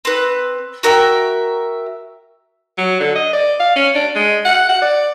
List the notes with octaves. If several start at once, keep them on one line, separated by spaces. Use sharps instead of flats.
C4 B4
F#4 A#4 E5 G5
F#3
D3
D#5
D5
F5
C#4
D4
G#3
F#5
F#5
D5